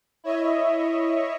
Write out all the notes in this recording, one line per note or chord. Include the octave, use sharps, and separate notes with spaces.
E4 C#5 D#5 E5